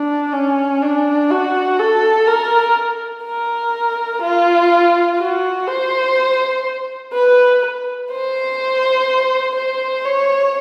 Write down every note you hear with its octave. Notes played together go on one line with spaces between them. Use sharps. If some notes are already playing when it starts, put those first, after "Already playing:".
Already playing: D4
C#4
D4
F#4
A4
A#4
A#4
F4
F#4
C5
B4
C5
C5
C#5